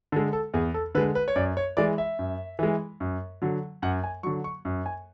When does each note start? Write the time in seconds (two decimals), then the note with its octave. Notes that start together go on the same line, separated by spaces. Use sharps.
0.12 D3 A4
0.16 G#3
0.33 A4
0.54 E2 G#4
0.74 A4
0.95 D3 B4
0.98 G#3
1.15 B4
1.28 C#5
1.36 F#2 D5
1.57 C#5
1.77 E3 G#3 D5
1.98 E5
2.19 F#2
2.59 E3 G#3
3.00 F#2
3.42 D3 F#3
3.82 F#2 F#5
4.04 G#5
4.23 D3 F#3 C#6
4.44 C#6
4.65 F#2
4.86 G#5